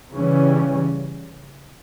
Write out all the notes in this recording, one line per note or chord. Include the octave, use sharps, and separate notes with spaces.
C#3 E3 G3 C#4